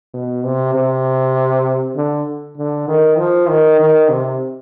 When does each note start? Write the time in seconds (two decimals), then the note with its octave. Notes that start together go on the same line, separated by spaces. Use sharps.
0.14 B2
0.44 C3
0.75 C3
1.96 D3
2.57 D3
2.88 D#3
3.18 F3
3.49 D#3
3.80 D#3
4.09 C3